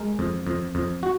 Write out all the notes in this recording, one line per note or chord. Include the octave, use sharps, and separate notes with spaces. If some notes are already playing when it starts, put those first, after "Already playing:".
Already playing: G#3 A#4
F2
F2
F2
F#4